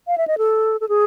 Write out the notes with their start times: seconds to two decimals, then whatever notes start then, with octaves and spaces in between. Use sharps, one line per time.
0.07 F5
0.18 E5
0.27 D#5
0.38 A4
0.81 A4
0.89 G#4